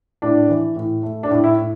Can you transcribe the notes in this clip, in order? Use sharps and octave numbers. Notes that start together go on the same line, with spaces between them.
A2 D4
E3
A2
A3
D4
A2
E4
A2